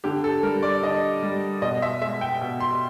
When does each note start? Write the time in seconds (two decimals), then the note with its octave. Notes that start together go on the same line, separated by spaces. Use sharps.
0.04 D3 G4
0.24 A4
0.43 G3 A#4
0.63 D5
0.82 D3 D#5
1.23 G3
1.62 B2 D#5
1.82 E5
2.01 G#3 E5
2.21 G5
2.41 B2
2.60 C6